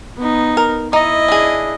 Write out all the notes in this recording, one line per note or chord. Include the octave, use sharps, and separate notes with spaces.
B3 D#4
A#4
D#4 E4 D#5
D4 G#4